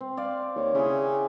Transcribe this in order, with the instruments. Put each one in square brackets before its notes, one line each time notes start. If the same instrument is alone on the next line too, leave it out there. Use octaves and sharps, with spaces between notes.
[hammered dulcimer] C4
C5 D5 F5
[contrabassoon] D#2 [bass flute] C#5
[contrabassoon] C#3 [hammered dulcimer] E4 G#4